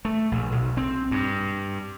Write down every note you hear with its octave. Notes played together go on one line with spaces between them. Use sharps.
A3
A#1
B1
C4
G2